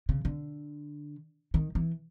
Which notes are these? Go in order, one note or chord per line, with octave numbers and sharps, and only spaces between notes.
C#3
D3
D#3
E3